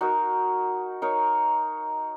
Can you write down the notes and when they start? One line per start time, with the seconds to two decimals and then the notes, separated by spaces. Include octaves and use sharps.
0.01 D#4 F#4 A#4
1.02 D#4 A#4 C#5